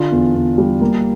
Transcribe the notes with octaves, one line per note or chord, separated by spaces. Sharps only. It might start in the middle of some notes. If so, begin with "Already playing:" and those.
Already playing: D3 D4 F4
E2
E2
G3
A#3